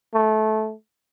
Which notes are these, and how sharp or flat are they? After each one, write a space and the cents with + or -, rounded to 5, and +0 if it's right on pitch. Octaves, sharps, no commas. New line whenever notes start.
A3 -20